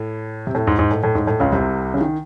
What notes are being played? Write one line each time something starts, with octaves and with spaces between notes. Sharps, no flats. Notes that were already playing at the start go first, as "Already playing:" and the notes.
Already playing: A2
C3
A2
G#2
G#2
A2
A2
G#2
A2
C#2 C#3
C2 C3
C#3
D#3